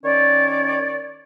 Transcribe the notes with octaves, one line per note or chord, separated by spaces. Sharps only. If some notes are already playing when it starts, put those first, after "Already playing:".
D#3 C#4 C#5 D5